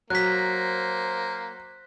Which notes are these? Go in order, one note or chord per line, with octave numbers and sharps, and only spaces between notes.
F#3 A#3 C5 F#6 B6